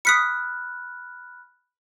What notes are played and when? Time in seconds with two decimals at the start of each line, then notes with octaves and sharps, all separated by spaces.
0.05 B5 D#6 F6 F#6 B6 C#7